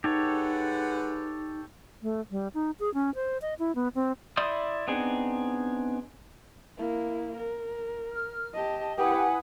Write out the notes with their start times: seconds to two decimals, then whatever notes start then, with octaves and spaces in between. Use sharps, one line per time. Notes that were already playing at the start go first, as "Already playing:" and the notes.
0.04 G#3 D#4 G4 A4 B4 C#5 F#5
2.03 A3
2.31 G3
2.54 D#4
2.80 G#4
2.94 C#4
3.15 C5
3.42 D#5
3.59 E4
3.75 B3
3.95 C4
4.37 E4 D5 C6 D#6 G6
4.88 B3 C4 D4 D#4 G#4
6.77 A#3 E4
7.37 A#4
8.11 F6
8.54 G4 D#5 A5
8.98 E4 G4 B4 F#5 G#5 D#6